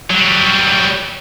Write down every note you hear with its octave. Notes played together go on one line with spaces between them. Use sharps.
F#3 G3